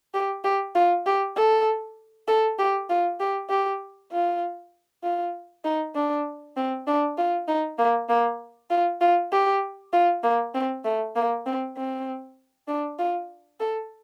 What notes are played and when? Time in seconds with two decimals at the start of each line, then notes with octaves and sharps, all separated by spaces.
0.14 G4
0.44 G4
0.75 F4
1.06 G4
1.36 A4
2.28 A4
2.58 G4
2.89 F4
3.20 G4
3.50 G4
4.12 F4
5.03 F4
5.64 D#4
5.95 D4
6.57 C4
6.87 D4
7.17 F4
7.48 D#4
7.78 A#3
8.09 A#3
8.70 F4
9.01 F4
9.32 G4
9.93 F4
10.23 A#3
10.54 C4
10.84 A3
11.16 A#3
11.46 C4
11.76 C4
12.68 D4
12.99 F4
13.60 A4